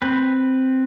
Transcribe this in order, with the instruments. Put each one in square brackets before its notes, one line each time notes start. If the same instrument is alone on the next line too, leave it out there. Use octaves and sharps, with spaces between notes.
[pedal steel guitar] C4 B4